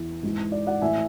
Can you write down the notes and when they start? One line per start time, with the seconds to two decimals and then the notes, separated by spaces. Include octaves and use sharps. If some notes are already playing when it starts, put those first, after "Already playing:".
Already playing: E2 E3
0.23 G#2 E3
0.52 D5
0.67 D5 F#5
0.82 A2 E3 E5 G#5